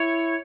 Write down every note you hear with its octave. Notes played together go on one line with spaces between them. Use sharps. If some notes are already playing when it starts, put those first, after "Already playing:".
Already playing: E4 C#5